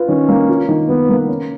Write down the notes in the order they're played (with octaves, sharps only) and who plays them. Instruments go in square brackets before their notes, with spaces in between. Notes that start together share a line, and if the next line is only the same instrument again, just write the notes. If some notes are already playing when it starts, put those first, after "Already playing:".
Already playing: [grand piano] F4 B4
[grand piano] D#3 [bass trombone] C#4
[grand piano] A#3
F4
D#3
[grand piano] D#3 [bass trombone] B3
[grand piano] A#3
C#4